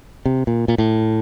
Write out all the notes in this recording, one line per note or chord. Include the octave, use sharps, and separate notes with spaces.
C3
A#2
A#2
A2